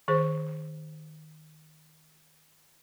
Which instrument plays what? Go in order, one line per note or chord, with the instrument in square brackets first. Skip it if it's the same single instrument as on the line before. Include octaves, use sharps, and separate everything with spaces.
[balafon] D#3 G#4 C5